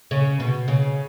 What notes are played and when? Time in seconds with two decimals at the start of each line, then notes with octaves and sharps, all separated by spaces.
0.11 C#3
0.40 B2
0.68 C#3